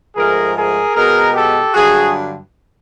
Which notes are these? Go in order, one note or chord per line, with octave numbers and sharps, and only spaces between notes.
G#2 F3 A3 G#4 A#4
G#4 A#4
B2 G#3 B3 G#4 A#4
G4 A4
G2 D3 F#3 F#4 G#4